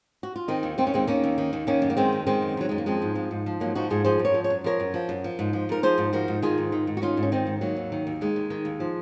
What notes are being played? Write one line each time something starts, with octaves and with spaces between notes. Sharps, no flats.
F#4
F4
D#3 C4 D#4
D#2
D#3 C4
C#4
D#2 G#3 C4
D#3 A#3 C#4
D#2
D#3
D#2
D#3 A#3 C#4
F#2
A#3
D#3 G#3 C4
F#2
D#3 G#3 C4
F#2
D#3 F#3
F#2 G#3
A#3
F3 G#3 C4
G#2
F3
G#2
F3
G#2 F#3 A#3
F3 D#4 F#4
G#2 F4 G#4
F3 G#4 C5
F#2
A#4 C#5
F3
C#5
F#2
F3 A#4 C#5
F#2
F3
F#2
F3
G#2
F3
G#2 A#4
F3 G#4 C5
G#2
F3 F#4 A#4
G#2
D#3 F4 G#4
G#2
D#3
G#2
F#4
D#3 C#4 F4
G#2
C#4
D#3 C4 D#4
G#2
D#3 F#3 A#3
D#2
D#3
D#2
D#3 G#3
D#2
D#3
D#2
F3